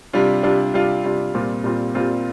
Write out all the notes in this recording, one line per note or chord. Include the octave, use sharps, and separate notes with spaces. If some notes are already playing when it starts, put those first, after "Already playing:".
C3 G3 D4 F4
C3 G3 D4 F4
C3 G3 D4 F4
C3 G3 D4 F4
A#2 G3 C4 F4
A#2 G3 C4 F4
A#2 G3 C4 F4